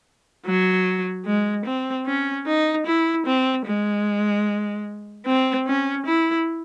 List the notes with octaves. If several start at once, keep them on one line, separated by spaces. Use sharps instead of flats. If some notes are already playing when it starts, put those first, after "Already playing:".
F#3
G#3
C4
C#4
D#4
E4
C4
G#3
C4
C#4
E4